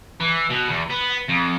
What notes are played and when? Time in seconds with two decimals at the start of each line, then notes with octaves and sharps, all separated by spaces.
0.21 E3
0.50 B2
0.68 E2
0.90 B3
1.28 F2